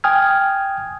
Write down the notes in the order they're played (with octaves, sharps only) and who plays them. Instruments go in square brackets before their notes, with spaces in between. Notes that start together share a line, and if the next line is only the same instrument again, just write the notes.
[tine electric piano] G5 G#5 D#6 F6 G#6